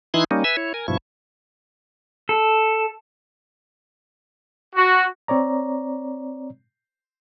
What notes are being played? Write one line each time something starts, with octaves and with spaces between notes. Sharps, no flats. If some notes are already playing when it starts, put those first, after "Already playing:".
E3 D#4 E4 C6 F#6 G#6
G3 A#3 C#4 D#4
B4 E5 G#5 E6
E4 C#5
A#4 G#5
G2 B2 F3 E4 C#6
A4
F#4
C4 C#5 D5 A#5